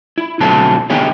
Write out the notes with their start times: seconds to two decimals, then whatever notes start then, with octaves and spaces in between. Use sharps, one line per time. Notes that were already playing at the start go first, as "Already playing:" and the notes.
0.18 E4
0.40 B2 D3 F#3 A3 C4 A5
0.90 D3 E3 B3 G4 G#4 C#5